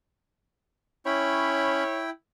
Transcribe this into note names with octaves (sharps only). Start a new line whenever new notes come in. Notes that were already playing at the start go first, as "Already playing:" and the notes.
C#4 E4 C#5 G5 B5